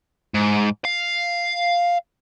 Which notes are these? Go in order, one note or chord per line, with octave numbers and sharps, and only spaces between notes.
G#2
F5